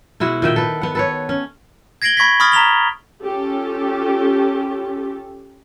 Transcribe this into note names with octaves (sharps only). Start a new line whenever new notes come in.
B2 G#3 E4 F#4
A#2 D#3 E5 G5
A4 B4
B3 F#5
A4 B4 C#5
C#4
G#6 A#6 C7 D7 F#7 G7
B5 C#6 G#6 A#6 B6
B5 C#6 D#6 F6 A6
A#5 B6 F7 G7
C#4 F4 G4 A4